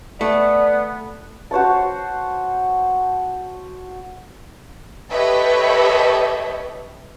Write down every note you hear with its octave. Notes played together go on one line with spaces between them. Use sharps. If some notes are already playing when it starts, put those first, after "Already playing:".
A3 B3 D5
F#4 C5 C#5 A5
G4 A4 B4 C#5 D#5 E5